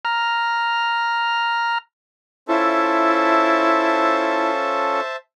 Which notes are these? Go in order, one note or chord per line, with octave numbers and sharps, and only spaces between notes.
A#5 F6
C#4 E4 F4 A4 C5 E5 A5